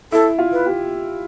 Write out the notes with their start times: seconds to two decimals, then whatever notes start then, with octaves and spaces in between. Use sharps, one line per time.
0.12 E4 A4
0.39 F4
0.52 B4
0.66 G4